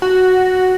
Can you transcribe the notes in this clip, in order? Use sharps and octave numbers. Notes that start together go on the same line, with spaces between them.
F#4